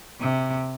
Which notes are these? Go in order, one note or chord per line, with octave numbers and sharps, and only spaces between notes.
C3